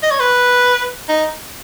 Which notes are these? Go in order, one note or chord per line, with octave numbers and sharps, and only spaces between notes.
D#5
C#5
B4
D#4